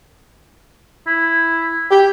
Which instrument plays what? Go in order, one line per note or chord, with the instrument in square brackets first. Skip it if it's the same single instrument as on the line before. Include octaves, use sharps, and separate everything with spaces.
[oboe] E4
[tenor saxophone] G4